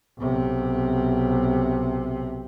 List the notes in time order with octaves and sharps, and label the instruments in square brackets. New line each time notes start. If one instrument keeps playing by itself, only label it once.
[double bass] B1 C3